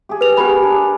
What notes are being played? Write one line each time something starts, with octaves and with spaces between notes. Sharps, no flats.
G4 G#4
B4 F7
B3 G4 G#4 A#4 B5
D4